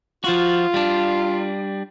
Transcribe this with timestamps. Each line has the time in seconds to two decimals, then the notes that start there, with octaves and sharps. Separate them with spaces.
0.24 F3 F4 F#4
0.74 G3 D4